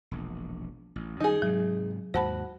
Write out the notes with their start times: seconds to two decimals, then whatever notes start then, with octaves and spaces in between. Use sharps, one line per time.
0.11 E1 A#1
0.96 A1
1.20 F#2 D#3 G3 D#4 G#4
1.42 G#2 C3 F#3
2.14 D#2 G#2 F#4 C5 A5 B5